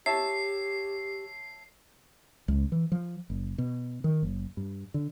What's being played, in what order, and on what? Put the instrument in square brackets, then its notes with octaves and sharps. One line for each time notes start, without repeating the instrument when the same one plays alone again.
[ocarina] G4 [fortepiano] C#5 E5 A5 [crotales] C7
[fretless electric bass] C#2
E3
F3
F#1
B2
D#3
F#1
G2
D3